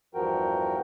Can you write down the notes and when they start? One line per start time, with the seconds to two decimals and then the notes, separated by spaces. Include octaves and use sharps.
0.14 E2 G2 F3 F#4 A#4 G5